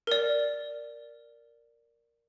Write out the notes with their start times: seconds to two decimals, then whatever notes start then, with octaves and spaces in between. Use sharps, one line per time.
0.07 A#4 D5